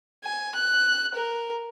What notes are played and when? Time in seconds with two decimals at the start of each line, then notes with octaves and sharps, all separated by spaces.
0.24 G#5
0.55 F#6
1.14 A#4